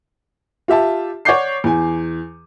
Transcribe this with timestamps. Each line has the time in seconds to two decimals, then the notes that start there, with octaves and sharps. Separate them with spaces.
0.68 F4 G4 E5 A5
1.25 C#5 D5 F#5 D6 G6 C7
1.64 E2 G#5